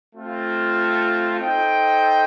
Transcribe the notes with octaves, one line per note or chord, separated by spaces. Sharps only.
A3 C4 F4
D#4 A4 C5 D#5 G5